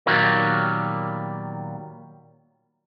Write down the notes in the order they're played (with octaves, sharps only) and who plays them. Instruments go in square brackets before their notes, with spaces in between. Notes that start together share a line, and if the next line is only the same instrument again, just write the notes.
[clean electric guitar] A#2 D#3 F#3 G3 A#3 B3